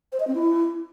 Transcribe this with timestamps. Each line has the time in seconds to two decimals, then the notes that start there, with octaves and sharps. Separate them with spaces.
0.12 C5
0.20 D#5
0.27 C4
0.35 E4